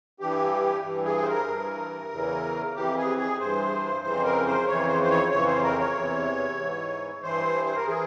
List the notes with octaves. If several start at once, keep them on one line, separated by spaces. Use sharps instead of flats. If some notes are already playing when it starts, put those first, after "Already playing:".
G2 E3 G4
G2 E3
G#4
C5
A#4
G2 E3
E2 C#3 E3
F2 E3 G4
G#4
G#4
G2 E3 C5
F2 C#3 E3 C5
A#4
C5
F2 C#3 E3 C#5
C5
C5
C#5
F2 C#3 E3 C#5
C5
A#4
C#5
E2 C3 E3
G#2 E3
G2 E3 C5
C5
A#4
E3 G#4